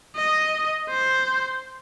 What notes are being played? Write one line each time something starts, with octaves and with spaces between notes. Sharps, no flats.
D#5
C5